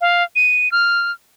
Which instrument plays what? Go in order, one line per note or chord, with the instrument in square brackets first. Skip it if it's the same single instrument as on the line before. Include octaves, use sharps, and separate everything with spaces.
[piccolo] F5
D#7
F6